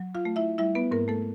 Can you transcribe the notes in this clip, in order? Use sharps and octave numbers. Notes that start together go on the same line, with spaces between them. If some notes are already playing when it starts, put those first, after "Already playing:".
Already playing: F#3
F4 F5
A3
E4 E5
G3 E4 E5
B3 B4
G#2 A#3 A#4
A3 A4